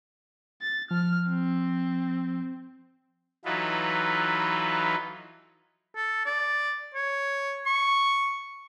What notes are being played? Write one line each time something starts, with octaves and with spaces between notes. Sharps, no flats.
A6
F3 F6
C4
E3 F#3 D#4 F4 A4 B4
A4
D5
C#5
C#6